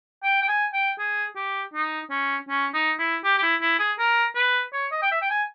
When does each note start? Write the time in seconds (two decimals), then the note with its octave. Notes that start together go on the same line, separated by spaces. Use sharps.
0.23 G5
0.42 G5
0.48 G#5
0.73 G5
0.99 G#4
1.36 G4
1.74 D#4
2.10 C#4
2.49 C#4
2.74 D#4
2.99 E4
3.24 G4
3.37 G4
3.42 E4
3.61 E4
3.79 G#4
3.99 A#4
4.36 B4
4.73 C#5
4.92 D#5
5.02 G5
5.11 E5
5.21 G5
5.30 G#5